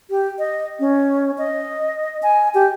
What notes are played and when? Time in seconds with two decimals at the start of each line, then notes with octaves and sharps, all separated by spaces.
0.10 G4
0.39 D#5
0.80 C#4
1.38 D#5
2.23 G#5
2.54 G4